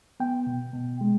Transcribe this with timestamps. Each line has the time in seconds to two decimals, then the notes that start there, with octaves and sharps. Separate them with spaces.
0.20 B3 G5
0.47 B2
0.74 B2
1.01 G#3